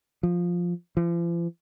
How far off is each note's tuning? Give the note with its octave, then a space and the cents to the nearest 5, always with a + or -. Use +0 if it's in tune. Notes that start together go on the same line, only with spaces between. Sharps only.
F3 +5
F3 -45